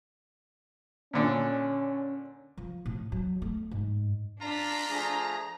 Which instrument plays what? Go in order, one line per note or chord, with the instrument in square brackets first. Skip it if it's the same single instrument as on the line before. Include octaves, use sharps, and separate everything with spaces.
[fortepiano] A#2 D3 [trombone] C#4
[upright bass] F3
A2
F#3
A3
G#2
[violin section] D4 B6 [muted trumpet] F4 [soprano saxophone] A#5
[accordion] F3 A3 G#4